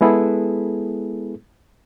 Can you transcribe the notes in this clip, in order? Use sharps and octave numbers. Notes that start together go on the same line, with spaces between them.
G#3 B3 E4 G#4 A4 B4